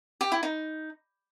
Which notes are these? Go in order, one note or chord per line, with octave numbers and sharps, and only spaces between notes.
G4
E4
D#4